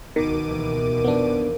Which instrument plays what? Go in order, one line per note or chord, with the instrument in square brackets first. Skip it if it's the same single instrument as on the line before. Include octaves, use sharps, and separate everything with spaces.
[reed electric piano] C#2 A#4 [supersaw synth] B2 D6 D#7 [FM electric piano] D#3
[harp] D#2 E3
[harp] A#1 F2 [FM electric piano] B3 D4